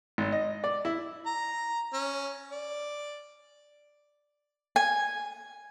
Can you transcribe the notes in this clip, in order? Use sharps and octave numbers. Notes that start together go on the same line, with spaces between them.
G#1
D#5
D5
E4
A#5
C#4
D5
G#5